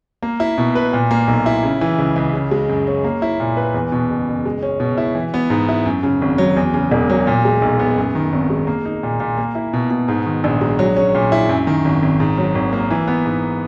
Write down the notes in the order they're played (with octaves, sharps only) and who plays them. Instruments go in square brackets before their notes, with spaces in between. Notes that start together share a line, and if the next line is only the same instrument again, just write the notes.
[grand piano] A#3
E4
B2
B4
A#2
A#3
B1
E4
C#3
E3
C#2
C#2
C#3
G#3
F#2
C#4
A#3
E4
A#2
B4
E2
B2
F#1
F#1
G#3
C#4
B2
E4
E3
B3
G#2
E4
F#2
C#3
G#1
F#3
E2
C#3
E1
F#3
A#2
G#3
B1
B3
F#2
D#3
G#1
G#3
A#3
D#4
A#2
A#2
A#3
E4
B2
B2
G#2
D#3
A#1
G#3
F#3
C#4
A#2
E4
F#2
D#3
G#1
G#1
G#2
F#3
G#1
A#3
E3
B3
G#2